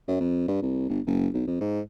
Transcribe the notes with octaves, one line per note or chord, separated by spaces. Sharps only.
F#2
F2
G2
C2
G1
F#1
B1
F2
G#2